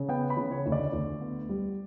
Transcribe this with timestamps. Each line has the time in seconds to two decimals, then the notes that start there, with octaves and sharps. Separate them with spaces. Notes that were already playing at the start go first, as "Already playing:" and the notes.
Already playing: C#3
0.09 B3 G5
0.30 B5
0.37 C#3
0.51 C#5
0.66 D2
0.72 D5
0.92 D2
1.21 B3
1.49 G3